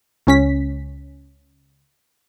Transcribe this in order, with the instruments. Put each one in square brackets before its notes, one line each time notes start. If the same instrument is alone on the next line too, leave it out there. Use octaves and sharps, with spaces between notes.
[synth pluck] C#2 C#4 B6